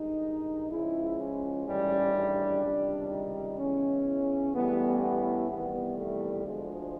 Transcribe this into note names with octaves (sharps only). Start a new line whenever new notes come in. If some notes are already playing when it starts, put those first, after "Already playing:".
Already playing: G2 D#3 G#3 D#4
C#2 C#3 F3 G#3 E4
C#4
A1 G#2 D#3 G3
D4
C#2 C3 D#3 G3
D#4
E2 C#3 E3 G#3 C#4
A1 A2 E3 G3 B3
B3
E2 C3 D#3 G3 B3
A3
D2 D3 F3 G#3